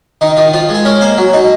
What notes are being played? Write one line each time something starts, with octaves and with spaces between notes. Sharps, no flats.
D#3 D#4
D#3 F4
F3 F4
G#3
G#4
C#4 A#4
A#3 C5
F#3
D#4